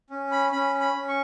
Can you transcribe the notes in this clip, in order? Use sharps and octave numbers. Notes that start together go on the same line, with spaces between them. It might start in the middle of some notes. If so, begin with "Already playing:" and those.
C#4
B5
C#4 B5
B5
C#4
C#6